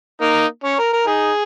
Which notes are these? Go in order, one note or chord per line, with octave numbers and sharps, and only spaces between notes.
A#3 D#4
C#4
A#4
A#4
D#4 G#4